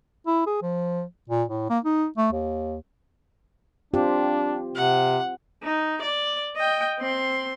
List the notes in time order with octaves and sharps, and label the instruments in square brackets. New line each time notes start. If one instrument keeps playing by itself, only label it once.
[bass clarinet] E4
G#4
F3
A#2
A2
A#3
D#4
A3
D#2
[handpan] C4 F4 G4 [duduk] D4
[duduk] C3 [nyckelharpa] F#5
[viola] D#4
D5
D#5 G5
C4 C6